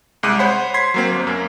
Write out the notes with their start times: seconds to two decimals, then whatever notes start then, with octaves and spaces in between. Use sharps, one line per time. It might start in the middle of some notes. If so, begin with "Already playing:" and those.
0.23 C2 G#3 D6 F#6 D#7
0.39 C5 C#5 F#5 B5 C6
0.74 C6 G#6 B6 C7
0.94 F#3 A#3 C4
1.12 G1
1.27 F#2 A#3